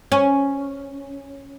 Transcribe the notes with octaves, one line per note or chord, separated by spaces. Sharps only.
C#4